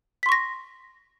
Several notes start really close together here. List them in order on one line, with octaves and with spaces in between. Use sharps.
B6 C6 C#6 A#6